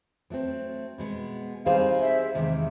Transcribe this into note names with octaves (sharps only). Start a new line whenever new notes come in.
F#3 A3 C4
B2 G#3 B3
G3 C4 D#4 G#4 C5 F5
E5
E2 C3 D#3 G#3